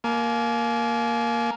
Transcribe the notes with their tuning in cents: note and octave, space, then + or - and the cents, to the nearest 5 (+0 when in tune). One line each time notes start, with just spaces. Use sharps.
A#3 +0 G#5 +40